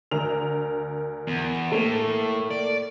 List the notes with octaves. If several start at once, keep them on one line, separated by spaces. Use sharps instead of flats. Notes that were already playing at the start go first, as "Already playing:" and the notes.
D2 A#4 F7
E2
A2 A3 A#3
D5